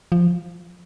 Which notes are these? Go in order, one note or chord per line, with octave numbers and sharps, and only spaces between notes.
F3